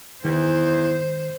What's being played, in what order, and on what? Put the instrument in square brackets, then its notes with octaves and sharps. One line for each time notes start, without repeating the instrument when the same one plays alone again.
[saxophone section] E2 [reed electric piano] D#3 [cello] C5